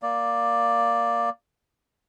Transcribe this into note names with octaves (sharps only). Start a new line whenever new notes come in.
A#3 D5